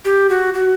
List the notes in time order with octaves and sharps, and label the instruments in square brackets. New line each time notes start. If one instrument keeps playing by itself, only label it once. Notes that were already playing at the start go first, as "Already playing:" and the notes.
[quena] G4
F#4
F#4